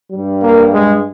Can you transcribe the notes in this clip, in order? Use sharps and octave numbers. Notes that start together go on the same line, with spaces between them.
G2 G3
A#3
G#3